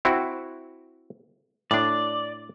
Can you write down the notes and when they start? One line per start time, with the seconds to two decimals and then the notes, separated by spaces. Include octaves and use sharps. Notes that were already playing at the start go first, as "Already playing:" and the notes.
0.05 C4 E4 F#4
1.71 A2 D4 D5